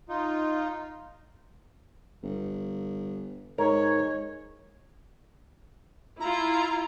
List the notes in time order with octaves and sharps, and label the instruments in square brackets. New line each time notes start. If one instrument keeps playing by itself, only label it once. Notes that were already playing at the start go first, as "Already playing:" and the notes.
[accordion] D#4 F4
[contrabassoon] G1
[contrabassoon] G#2 [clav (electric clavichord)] A#4 [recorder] C#5
[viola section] E4 F4 [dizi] A#5